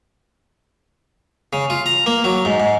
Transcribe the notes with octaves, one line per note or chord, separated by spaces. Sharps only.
C#3
F4
A#5
A#3
F#3
G#2
G#2